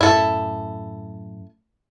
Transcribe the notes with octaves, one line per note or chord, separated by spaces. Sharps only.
F#2 A2 E4 A4